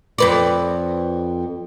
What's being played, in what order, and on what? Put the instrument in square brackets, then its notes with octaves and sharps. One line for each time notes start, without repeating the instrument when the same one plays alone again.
[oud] F2 B4 D5